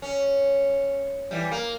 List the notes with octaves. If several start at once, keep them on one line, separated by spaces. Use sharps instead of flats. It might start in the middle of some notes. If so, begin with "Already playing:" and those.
C#4
E3 G3
A#3